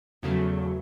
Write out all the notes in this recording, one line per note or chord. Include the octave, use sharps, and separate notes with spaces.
E2 C#3 F#3 A3 F#4